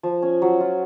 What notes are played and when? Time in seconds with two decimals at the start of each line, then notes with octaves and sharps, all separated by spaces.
0.03 F3
0.22 C#4
0.42 F#3
0.60 F4